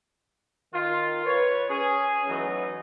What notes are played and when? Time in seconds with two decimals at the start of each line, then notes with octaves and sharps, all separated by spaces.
0.73 D#3 F4
1.25 B4 C#5
1.69 C#4 G#4
2.27 E3 F#3 A3 B3 D#4